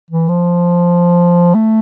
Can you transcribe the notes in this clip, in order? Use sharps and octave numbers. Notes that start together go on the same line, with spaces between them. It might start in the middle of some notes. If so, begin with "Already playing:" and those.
E3
F3
A3